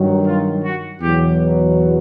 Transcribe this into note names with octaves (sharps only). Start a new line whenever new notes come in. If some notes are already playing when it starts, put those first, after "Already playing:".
Already playing: G2 D#3 F#3
F4
F#4
E2 B2 F#3 G4